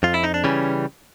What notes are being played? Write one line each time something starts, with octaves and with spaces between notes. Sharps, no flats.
F2 F4
E4
D#4
D4
C#3 E3 G3 C#4